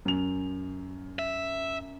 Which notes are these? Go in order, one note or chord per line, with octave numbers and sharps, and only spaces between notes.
F#2 F7
E5